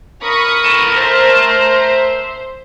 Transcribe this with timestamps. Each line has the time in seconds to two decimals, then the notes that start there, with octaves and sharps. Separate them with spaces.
0.24 A#4 B5 C#6 D#6
0.65 A4 B4
0.97 C5 E5 A5